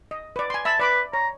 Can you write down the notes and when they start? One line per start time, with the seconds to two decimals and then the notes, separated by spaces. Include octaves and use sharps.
0.11 D#5
0.36 B4 D5
0.50 G#5 C6
0.65 E5 A5 B5 E6
0.80 B4 D5 B5 D6
1.13 C#5 A#5